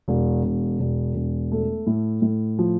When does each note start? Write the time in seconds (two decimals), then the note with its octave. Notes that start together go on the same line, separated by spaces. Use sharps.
0.08 E1
0.44 E1
0.80 E1
1.15 E1
1.52 A3
1.87 A2
2.22 A2
2.59 F3